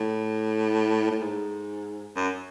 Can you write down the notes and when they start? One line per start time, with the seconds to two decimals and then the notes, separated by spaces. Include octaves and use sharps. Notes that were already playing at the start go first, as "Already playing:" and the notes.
Already playing: A2
1.11 A2
1.22 G#2
2.16 F#2